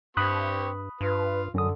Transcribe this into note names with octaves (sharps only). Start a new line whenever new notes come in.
G2 C4 G4 B5 C#6 D#6 F#6
G2 F4 B4
F#2 D3 C#4 D#6